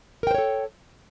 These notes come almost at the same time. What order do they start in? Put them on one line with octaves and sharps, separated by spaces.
A#4 G5 C5 C#5 A4